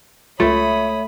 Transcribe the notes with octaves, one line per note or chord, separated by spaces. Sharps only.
C#2 A3 F4 C#5 E5 B5 D#6